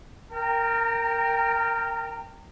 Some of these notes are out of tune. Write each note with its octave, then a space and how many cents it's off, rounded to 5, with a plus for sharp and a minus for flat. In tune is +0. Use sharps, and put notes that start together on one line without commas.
A#4 -10 G5 +0 A#5 -40